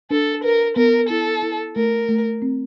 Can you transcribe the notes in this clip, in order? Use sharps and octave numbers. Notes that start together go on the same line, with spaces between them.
D4 A4
A#4 B4
B3 A#4
E4 A4
E4
A3 A#4
A3
C4